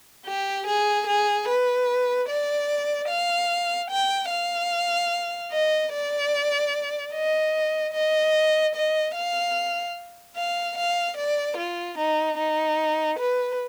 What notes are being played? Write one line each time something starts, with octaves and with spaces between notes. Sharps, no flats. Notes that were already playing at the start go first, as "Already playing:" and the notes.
G4
G#4
G#4
B4
D5
F5
G5
F5
D#5
D5
D#5
D#5
D#5
F5
F5
F5
D5
F4
D#4
D#4
B4